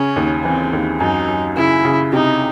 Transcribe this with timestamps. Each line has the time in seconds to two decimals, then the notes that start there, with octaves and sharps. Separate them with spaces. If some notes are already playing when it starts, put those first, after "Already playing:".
Already playing: C#3 C#4
0.16 D#2
0.45 E3 C4
0.73 D#2
1.00 F#2 D#4
1.28 F#2
1.57 C#3 E4
1.85 C#3
2.12 C3 D#4